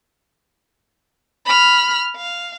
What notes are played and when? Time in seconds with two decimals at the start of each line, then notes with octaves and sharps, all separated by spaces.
1.46 B5 F6
2.16 F5